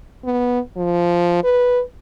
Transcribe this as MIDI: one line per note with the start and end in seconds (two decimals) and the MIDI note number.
0.25 0.60 59
0.77 1.40 53
1.44 1.81 71